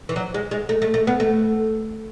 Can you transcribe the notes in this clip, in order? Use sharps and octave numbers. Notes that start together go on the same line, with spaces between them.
E3
F#3
G#3
G#3
A3
A3
A3
B3
A3